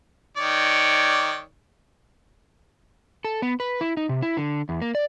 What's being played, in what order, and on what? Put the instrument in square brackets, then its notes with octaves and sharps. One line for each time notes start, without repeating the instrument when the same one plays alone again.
[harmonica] D#3 C#5 D5
[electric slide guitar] A4
B3
B4
E4
D#4
C3
E4
D3
E2
A#3
D5